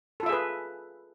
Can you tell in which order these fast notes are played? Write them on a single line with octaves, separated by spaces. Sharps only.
A4 F4 E5 G#4 B4